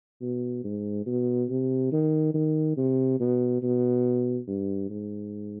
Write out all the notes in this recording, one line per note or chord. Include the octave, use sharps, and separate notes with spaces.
B2
G#2
B2
C3
D#3
D#3
C3
B2
B2
G2
G#2